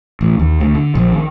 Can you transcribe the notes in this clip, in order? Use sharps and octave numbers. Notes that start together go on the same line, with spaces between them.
A1
D#2
D2
D3
A#1
D#3